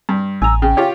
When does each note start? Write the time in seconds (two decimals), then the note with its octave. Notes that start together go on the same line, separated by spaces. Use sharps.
0.09 G2
0.42 A1 G#5 A#5 E6
0.62 C#3 G5
0.77 F4 G4 C#5